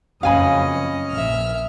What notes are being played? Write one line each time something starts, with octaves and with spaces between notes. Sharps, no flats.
F#1 F2 C#4 D#5 F5 G#5 B5
A#1 E5 F6